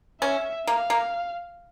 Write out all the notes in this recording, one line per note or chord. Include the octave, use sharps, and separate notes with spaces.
C#4 E5
A#3 F5
A#3